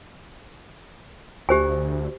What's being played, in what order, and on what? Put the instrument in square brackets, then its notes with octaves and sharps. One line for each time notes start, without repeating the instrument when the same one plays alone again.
[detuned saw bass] D2 [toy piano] G4 C5 G#5